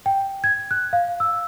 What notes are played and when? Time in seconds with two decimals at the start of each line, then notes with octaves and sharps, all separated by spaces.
0.06 G5
0.44 G#6
0.71 F#6
0.93 F5
1.20 E6